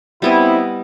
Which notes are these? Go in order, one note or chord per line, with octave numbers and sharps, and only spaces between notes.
G3 B3 C4 E4 D#5